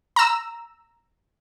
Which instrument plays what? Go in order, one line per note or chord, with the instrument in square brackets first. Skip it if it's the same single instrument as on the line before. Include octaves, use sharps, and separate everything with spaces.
[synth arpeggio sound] A#5 E6